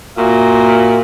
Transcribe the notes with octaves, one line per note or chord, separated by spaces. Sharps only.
A#2 F#4 E5